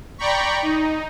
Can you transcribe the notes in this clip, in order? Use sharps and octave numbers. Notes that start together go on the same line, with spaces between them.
D5 G5 A#5 B5 C#6
D#4